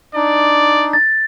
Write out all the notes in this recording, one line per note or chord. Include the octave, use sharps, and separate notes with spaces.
D4 D#4 D5
A6